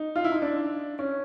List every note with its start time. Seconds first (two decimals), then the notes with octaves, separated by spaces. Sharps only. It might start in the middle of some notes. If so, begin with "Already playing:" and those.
Already playing: D#4
0.16 F4
0.24 E4
0.32 D#4
0.42 D4
0.99 C#4